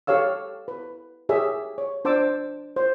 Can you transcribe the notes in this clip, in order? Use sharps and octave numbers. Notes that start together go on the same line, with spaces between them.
G4 A4 C#5 F5 E6
B4
G4 G#4 A#4 C#5 E5
C#5
D4 C5 A5 D6 E6
C5